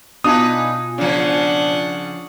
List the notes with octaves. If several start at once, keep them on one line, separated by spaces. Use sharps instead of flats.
B2 D4 D#4 F4 B4 G#5 D#6
C#3 F3 D4 F#5